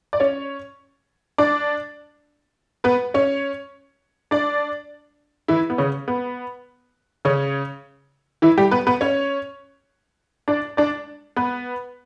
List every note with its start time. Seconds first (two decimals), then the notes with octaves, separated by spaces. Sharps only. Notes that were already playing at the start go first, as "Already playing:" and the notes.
0.13 D5
0.20 C#4 C#5
1.38 D4 D5
2.84 B3 B4
3.14 C#4 C#5
4.31 D4 D5
5.48 E3 E4
5.70 B3
5.78 C#3 C#4
6.08 B3
7.25 C#3 C#4
8.42 E3 E4
8.57 G3 G4
8.71 B3 B4
8.87 B3 B4
9.01 C#4 C#5
10.48 D4 D5
10.77 D4 D5
11.36 B3 B4